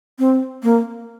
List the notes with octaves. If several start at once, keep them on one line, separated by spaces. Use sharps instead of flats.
C4
A#3